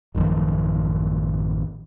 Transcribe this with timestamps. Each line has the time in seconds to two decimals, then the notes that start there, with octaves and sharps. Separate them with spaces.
0.15 A1 F#2 D#3 F3